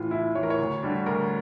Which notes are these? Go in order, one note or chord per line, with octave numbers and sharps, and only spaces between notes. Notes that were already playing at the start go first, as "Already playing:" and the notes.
Already playing: A2 E3 F4
A1 E4
A2 E3 C#5
A#4
C#5
D2
D3 G3 D4
D2 A#4